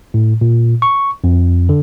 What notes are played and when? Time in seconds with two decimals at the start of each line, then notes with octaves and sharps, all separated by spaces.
0.14 A2
0.41 A#2
0.82 C#6
1.24 F2
1.69 D3